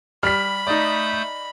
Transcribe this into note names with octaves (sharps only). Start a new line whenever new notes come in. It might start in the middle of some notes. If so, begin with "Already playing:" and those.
G3 B5 F6 B6
A3 D#4 D5 D#6 G6